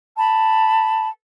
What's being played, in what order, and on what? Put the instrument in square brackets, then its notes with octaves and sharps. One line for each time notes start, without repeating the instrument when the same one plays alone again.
[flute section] A5 B5